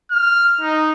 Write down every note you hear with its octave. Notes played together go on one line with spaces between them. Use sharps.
F6
D#4